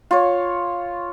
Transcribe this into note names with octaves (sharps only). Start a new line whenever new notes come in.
F4 C#5